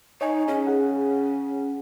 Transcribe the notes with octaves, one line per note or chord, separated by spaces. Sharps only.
D#4 C#5 D#5 G#5
C#3 C#4
G#4 F#5